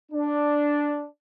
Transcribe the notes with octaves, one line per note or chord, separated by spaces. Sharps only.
D4